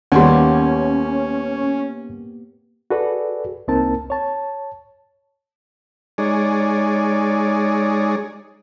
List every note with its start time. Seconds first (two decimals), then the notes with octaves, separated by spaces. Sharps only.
0.12 D#2 G3 A#3 B3 C#4 G4 F#5 C6
2.90 F#4 G#4 A4 B4 D5
3.68 C2 A#3 C4 D#4 A#4 A5
4.10 C#5 A5
6.18 G#3 D#4 G#4 C#5 D5